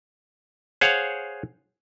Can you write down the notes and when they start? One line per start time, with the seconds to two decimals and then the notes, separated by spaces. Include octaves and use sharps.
0.81 G#4 C5 C#5 F5 F#5